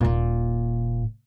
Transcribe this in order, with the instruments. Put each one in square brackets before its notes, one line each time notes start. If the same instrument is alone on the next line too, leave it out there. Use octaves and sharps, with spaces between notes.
[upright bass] D#1 A#2